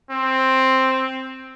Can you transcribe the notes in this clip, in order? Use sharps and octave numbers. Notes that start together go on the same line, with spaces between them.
C4